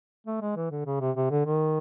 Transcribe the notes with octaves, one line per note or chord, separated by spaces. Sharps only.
A3
G#3
E3
D3
C#3
C3
C3
D3
D#3